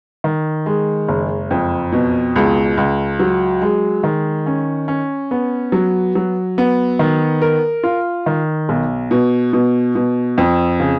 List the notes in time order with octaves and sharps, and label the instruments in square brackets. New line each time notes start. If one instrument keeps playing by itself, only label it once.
[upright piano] D#3
G#3
F#1
F2
B2
C#2
C#2
F#3
G#3
D#3
C#4
C#4
B3
F#3
F#3
B3
D#3
A#4
F4
D#3
B1
B2
B2
B2
F2
C#3